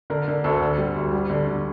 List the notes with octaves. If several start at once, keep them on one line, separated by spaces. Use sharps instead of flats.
D3 A#4
D3
D2 A4
D3
G3
D2
G3
D3
D3